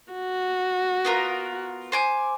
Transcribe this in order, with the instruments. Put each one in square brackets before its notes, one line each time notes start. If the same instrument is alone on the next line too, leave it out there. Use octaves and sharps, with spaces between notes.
[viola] F#4
[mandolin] B3 F4 A#4
C5 G#5 D6